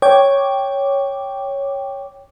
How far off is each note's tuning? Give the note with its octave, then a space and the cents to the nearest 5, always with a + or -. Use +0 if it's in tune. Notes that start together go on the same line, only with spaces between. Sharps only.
C#5 +0 G5 +0 D6 +0